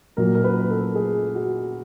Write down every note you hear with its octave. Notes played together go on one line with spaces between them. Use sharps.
A#2 F#3 A#4
A#4
B4
A4
G#4
F#4